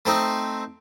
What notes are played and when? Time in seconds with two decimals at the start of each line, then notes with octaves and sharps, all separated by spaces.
0.06 A3 C4 D#4